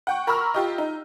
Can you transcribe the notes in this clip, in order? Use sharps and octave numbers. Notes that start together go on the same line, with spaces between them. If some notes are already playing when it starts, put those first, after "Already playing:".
F#5 G5 C#6
A#4 A#5 B5 C#6 E6 F6
F4 G4 D#5
D#4